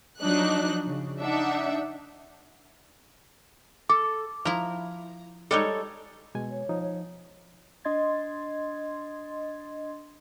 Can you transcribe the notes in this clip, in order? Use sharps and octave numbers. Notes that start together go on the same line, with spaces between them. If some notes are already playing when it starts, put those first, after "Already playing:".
F3 F#3 D4 D#4 D#5 F#6
C#3
D4 D#4 E5 F#5
A4 D6
F3 E4 A#5
G3 G#3 D#4 A4 C#5
B2 G#3 G#5
C#5
F3 D#4
C#5
D4 D#5 C6 G#6 A6